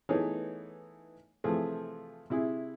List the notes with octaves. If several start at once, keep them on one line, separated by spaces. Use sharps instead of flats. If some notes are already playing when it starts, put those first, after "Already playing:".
E3 A3 B3 D#4 G#4 C#5
C3 E3 F3 A3 G#4
C3 E4 G#4